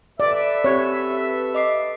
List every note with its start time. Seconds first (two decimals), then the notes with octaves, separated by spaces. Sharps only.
0.20 A4 B4 D5 E5
0.64 C4 G4 C#5
1.55 D#5 D6 C7